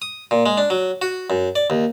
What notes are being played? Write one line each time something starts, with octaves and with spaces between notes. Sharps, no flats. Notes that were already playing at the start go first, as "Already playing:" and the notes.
D#6
A#2
G#3
D4
F#3
F#4
F#2
D5
D#2